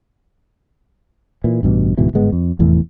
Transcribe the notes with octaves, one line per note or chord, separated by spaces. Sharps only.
A#2 E3
A1 G2 B2
D1 G#2 B2 E3
G1 G#2 G#3 B3
F2
F1 E2 A2 E3